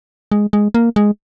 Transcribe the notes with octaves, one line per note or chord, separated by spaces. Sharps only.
G#3
G#3
A#3
G#3